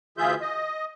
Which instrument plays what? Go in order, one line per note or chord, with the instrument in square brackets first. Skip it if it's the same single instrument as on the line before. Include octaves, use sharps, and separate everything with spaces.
[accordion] D2 E3 F4 G#4 E5 G6
D#5